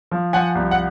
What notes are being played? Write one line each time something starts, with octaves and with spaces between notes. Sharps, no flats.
F3
F3 F#5 G#5
C2
F#5